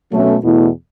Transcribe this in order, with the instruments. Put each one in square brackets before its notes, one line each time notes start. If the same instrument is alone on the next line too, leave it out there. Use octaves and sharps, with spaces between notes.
[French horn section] B2 F#3 A3 C#4
E2 B2 A3 E4